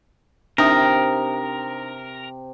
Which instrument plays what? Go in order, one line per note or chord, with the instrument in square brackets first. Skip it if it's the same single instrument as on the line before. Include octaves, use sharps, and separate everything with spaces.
[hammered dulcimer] C3 [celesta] D4 D#4 D#6 [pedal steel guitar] A#4